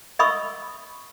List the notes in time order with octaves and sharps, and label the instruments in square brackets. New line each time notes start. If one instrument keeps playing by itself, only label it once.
[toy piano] D#5 E5 B5 C#6 D#6 E6